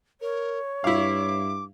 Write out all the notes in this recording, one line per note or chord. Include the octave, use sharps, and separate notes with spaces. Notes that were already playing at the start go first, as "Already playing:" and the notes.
A#4 C#5
G2 E4 F5 D6